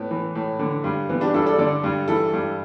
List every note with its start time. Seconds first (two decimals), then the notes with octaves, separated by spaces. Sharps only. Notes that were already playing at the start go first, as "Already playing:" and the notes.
Already playing: A2 B3
0.11 E3
0.35 A2
0.59 D3
0.84 G2
1.09 E3 B3
1.21 D4 G4
1.34 G2 E4 A4
1.46 A4 D5
1.58 D3 A4 D5
1.84 G2
2.08 E3 E4 A4
2.33 G2